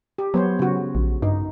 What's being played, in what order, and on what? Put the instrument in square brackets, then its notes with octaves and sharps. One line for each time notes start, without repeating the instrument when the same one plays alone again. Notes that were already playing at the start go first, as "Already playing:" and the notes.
[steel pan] G4
[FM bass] F#3 [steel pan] B3 C5 C#5
[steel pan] C#3 F#4
[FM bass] A#1
[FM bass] G2 [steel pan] D#4